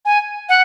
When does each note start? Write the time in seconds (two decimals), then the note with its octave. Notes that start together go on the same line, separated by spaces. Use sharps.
0.05 G#5
0.49 F#5